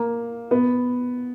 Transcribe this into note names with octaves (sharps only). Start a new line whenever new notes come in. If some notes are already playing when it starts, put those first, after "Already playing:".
Already playing: A#3
B3